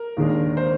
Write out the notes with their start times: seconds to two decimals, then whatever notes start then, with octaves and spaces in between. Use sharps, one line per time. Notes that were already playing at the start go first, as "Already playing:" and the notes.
Already playing: A#4
0.17 D#2 D#3 G#3 D4
0.57 C5